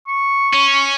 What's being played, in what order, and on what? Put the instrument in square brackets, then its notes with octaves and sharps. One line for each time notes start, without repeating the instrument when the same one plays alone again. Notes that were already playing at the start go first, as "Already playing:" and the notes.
[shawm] C#6
[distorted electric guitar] C#4